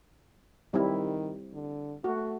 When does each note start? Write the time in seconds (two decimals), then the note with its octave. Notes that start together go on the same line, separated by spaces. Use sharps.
0.74 D#3 G3 C4 E4
1.53 D3
2.04 A3 F#4